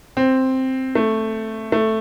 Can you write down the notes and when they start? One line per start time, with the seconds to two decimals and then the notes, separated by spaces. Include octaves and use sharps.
0.17 C4
0.95 A3
1.72 A3